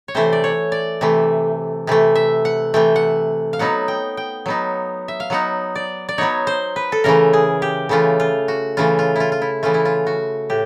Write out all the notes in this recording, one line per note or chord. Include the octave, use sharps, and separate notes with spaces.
C#5
C3 E3 A3 C5
D5
C#5
D5
C3 E3 A3
C3 E3 A3
E5
F#5
C3 E3 A3 G5
F#5
F5
F#3 B3 D#4 F#5
G5
G5
F#3 B3 D#4
E5
F5
F#3 B3 D#4 F#5
D5
D5
F#3 B3 D#4 C#5
C5
B4
A4
C#3 E3 A3 A#4
G#4
G4
C#3 E3 A3 F4
F4
F#4
C#3 E3 A3 F4
F4
E4 F4
F4
E4
C#3 E3 A3 F4
E4
F4
F#4
A2 G4